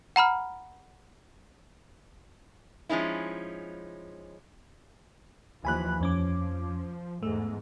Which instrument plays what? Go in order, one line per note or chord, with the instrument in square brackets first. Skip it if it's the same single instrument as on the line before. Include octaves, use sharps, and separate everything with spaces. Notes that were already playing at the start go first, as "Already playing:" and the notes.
[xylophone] F#5 A#5 B5 F6
[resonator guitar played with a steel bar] F3 G#3 C#4 D#4 E4
[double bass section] D#2 E3 F3 [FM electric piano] G#5 B5 F#6
[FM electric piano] F2 C#4 D6 [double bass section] F3
[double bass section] E2 G#2 [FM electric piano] A3